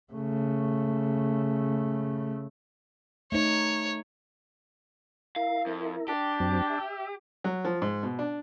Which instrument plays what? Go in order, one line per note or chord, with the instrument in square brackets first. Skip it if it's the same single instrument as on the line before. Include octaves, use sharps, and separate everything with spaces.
[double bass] C#3 A3
[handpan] A3 D#4 [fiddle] C#5
[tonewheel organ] E4 A#4 [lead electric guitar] F5
[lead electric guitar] F2
[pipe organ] D4 [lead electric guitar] G4
[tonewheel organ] F#2 F#3 C4
E5
[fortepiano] F#3
F3
G#2
B2
D4